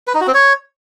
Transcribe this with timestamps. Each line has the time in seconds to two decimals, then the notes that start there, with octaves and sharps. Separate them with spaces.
0.07 B4
0.14 D#4
0.21 F#4
0.27 C4
0.34 C#5